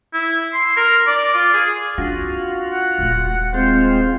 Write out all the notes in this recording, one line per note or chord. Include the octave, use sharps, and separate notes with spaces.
E4
C6
A#4
D5
F4
G#4
C4 D4 F4 F#4
F#5
D#1 A3
G#3 C4 F4 C5